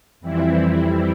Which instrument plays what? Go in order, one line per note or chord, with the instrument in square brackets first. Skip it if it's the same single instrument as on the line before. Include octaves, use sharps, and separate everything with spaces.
[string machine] F2 E3 G3 C4 E4